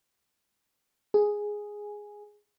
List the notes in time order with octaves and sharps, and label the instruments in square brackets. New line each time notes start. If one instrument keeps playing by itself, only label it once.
[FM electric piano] G#4